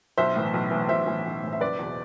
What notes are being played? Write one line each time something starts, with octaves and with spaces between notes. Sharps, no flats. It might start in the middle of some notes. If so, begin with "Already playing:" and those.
B1 C5 E5
A2 E3
B1
A2 E3
B1 C5 E5
A2 E3
B1
A2 E3
E5
F#1 B4 D5
E2 B2